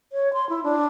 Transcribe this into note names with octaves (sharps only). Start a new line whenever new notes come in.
C#5
C6
E4
D4